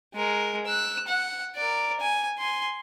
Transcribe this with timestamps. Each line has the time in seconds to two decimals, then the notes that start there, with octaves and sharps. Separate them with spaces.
0.14 G#3 A#4
0.66 E6 F#6
1.07 F#5
1.55 A#4 D5
2.00 G#5
2.38 G#5 C6